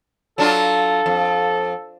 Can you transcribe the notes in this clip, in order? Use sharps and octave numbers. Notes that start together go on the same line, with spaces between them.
F#3 D4 F4 A4
F2